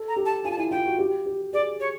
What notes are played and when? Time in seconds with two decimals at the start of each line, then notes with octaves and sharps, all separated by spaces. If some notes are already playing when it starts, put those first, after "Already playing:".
Already playing: A4
0.08 A#5
0.16 G4
0.26 A5
0.45 F4 G#5
0.51 A5
0.58 E4 G#5
0.71 F4 G5
0.85 F#4
0.99 G4
1.26 G4
1.53 G#4 D5
1.80 C#5